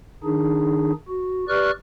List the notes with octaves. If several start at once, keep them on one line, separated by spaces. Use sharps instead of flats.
D#3 D4 D#4 G#4
F#4
G4 B4 D5 C#6 F6 F#6